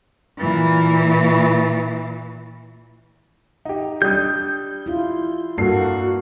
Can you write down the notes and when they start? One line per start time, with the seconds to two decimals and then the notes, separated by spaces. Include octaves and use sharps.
0.38 A#2 E3
3.65 D#4 G4
4.02 G3 D4 D#6 G6
4.86 E4 F4
5.58 G2 A#3 F#4 A4 C7